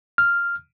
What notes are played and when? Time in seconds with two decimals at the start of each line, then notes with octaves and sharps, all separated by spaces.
0.18 F6